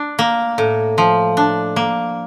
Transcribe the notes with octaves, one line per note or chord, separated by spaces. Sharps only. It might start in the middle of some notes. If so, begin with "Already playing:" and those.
Already playing: D4
A#3
A2
F3
D4
A#3